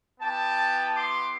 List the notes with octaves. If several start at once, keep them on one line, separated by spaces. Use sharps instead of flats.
B3 E4 G4 G5 A5
C6 D6